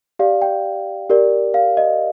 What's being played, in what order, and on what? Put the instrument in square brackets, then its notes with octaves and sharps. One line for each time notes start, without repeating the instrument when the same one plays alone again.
[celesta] G4 D5 F5
G5
G4 A#4 D5
F5
D#5